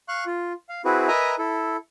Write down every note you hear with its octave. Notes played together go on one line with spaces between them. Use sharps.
F5 C#6 F#6
F4
F5
C4 E4 F#4 G#4 B4
A#4 B4 D#5 E5 G#5 A#5
E4 A4